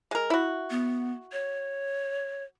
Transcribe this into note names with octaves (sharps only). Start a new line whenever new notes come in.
G#3 A#4
E4 F#4
B3
C#5